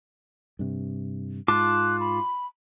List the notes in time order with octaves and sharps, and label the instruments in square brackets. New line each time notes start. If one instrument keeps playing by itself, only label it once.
[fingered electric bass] G2 C3
[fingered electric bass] G#2 [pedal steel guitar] F4 A5 D6 [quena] F#6
[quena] B5